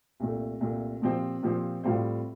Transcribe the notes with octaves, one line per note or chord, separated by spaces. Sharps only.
C2 A#2 A3
C2 A#2 A3
A#2 F3 C4 G4 C5
A#2 F3 C4 G4 C5
A2 G3 C4 F4 C5